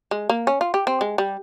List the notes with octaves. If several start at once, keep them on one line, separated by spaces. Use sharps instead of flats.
G#3
A#3
C#4
F4
G4
C4
G#3
G3